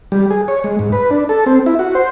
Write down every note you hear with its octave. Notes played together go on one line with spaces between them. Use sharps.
G3
G#4
C#5
G#3
G#2
B4
D4
A4
C4
E4
F#4
C5